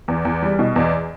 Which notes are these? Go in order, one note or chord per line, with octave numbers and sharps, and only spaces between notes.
E2
E2
G3
B2
E2